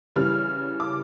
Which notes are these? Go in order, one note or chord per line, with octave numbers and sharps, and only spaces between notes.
C#3 E3 G3 F6
D6